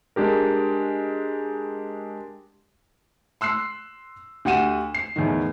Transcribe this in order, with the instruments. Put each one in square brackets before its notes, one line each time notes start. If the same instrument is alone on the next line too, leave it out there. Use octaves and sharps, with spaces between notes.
[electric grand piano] G#3 D4 G4 A#4
[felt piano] C6 E6 F#6 C7
D2 G4 F#5 D#7 E7
C7
E2 A2 D#3